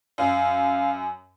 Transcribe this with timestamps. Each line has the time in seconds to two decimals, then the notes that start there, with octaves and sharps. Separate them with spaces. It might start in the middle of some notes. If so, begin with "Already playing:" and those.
0.18 F#2 F5